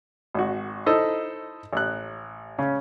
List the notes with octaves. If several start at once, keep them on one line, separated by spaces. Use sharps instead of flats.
G#1 F#4
D#4 E4 A4 C5 D#5
A1 F#6
C#3 C#4